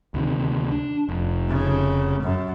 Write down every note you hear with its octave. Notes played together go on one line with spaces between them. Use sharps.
D2 C3 D#3
D4
F1
C#3
F#2